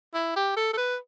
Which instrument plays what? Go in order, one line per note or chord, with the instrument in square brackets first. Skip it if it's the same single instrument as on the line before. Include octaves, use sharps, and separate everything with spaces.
[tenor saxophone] E4
G4
A4
A4
B4